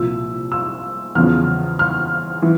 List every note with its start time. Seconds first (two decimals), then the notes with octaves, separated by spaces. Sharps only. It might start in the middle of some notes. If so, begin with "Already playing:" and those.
Already playing: C2 A#2 F3 E6
0.52 E6
1.15 E2 C#3 F3 F6
1.79 F6
2.42 E3